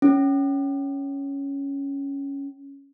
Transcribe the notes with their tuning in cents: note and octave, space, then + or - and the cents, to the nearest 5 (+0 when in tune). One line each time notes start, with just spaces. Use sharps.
C#4 +5